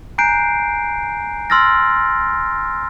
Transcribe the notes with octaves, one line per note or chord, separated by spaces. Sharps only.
G#5 A#5 F#6 G6 C7 D7
C6 E6 F6 A6 A#6